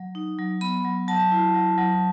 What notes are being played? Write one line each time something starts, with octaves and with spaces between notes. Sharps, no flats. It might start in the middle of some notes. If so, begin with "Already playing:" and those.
Already playing: F#3
D#4
F#3
B3 B5
F#3
F#3 A5
E4
F#3
F#3